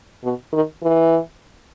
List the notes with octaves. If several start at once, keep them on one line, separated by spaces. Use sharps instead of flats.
B2
D#3
E3